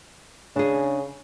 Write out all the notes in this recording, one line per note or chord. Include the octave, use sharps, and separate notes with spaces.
C#3 D4 G#4